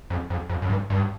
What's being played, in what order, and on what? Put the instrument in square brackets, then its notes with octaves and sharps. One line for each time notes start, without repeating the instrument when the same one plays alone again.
[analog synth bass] F2
F2
F2
F#2
G2
G2